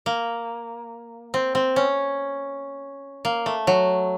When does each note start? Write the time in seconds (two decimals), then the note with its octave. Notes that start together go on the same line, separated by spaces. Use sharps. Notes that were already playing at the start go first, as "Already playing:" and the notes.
0.06 A#3
1.34 C4
1.55 C4
1.76 C#4
3.25 A#3
3.46 A3
3.67 F#3